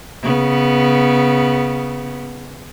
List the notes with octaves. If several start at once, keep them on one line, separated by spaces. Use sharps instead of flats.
C#3 B3